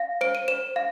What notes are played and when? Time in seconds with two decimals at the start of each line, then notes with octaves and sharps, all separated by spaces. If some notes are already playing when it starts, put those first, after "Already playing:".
Already playing: F5
0.21 C5 D7
0.35 D#7
0.48 C5 E7
0.76 F5